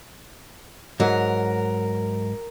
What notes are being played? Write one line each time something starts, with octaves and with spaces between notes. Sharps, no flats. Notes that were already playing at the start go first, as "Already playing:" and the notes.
G#2 F#3 A#4